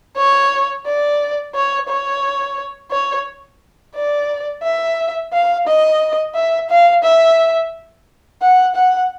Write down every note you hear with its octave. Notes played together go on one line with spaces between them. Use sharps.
C#5
D5
C#5
C#5
C#5
D5
E5
F5
D#5
E5
F5
E5
F#5
F#5